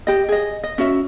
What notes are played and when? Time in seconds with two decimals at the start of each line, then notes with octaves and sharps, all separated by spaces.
0.07 G4 D#5
0.29 G#4 D#5
0.63 D#5
0.78 C#4 F#4 E5